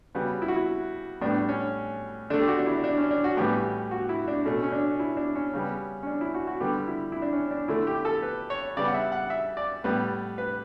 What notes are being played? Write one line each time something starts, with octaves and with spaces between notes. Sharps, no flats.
C#3 G3 B3 F#4
E4
F#4
E4
A2 G3 B3 D4
C#4
D3 A3 D4
G4
F#4
D4
E4
D4
C#4
D4
F#4
A2 E3 G3 B3 G4
F#4
E4
D4
B2 A3 C#4
C#4
D4
E4
D4
C#4
C#3 G3 B3
C#4
D4
E4
F#4
F#4
D3 G3 B3 G4
E4
E4
D4
C#4
D4
D3 A3 E4
G4
A4
B4
C#5
C#3 G3 B3 D5
F#5
E5
F#5
E5
D5
A2 G3 B3
B4